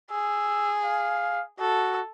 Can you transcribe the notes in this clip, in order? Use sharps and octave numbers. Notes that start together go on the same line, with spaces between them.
G#4 E6
F5
F#4 A4